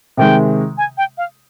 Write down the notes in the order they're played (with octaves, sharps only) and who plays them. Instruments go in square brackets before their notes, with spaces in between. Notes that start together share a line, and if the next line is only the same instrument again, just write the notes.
[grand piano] C3 D#3 G#3 [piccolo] G5
[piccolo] G#5
G5
F5